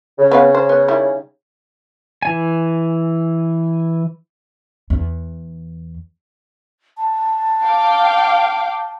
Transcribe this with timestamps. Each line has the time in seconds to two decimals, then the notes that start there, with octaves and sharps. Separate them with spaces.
0.19 C#3
0.31 B3 B4 F5
0.55 C5
0.69 B3
0.88 D#3 G3 E4
2.22 E3 G#5
4.90 E2
6.97 A5
7.64 F5 G5 D6